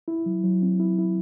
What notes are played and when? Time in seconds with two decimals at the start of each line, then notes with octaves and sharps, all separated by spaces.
0.08 E4
0.26 F#3
0.43 F#3
0.62 C4
0.80 E4
0.98 E4